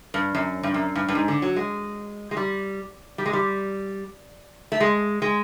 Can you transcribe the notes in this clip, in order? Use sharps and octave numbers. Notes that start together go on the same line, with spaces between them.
G2
F#2
G2
F#2
G2
G2
G#2
D3
F#3
G#3
G#3
G3
G3
G#3
G3
A3
G#3
G#3